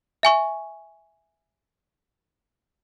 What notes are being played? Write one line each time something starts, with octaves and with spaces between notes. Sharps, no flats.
E5 G#5 C#6